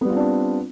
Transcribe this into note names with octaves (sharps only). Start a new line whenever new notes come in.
G3 B3 C4 D4 F4